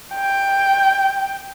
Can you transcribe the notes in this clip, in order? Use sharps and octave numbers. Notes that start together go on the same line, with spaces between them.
G5